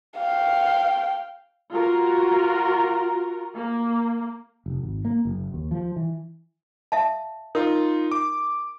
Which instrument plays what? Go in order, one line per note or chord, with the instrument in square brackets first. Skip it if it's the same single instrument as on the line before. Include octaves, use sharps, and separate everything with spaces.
[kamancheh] F5 G5
[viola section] F4 F#4 A#4
A#3
[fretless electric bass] F1
G#1
A#3
F#1
D#2
F3
E3
[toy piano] E5 F5 A5
[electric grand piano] D#4 F4 [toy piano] A#4
[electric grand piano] D6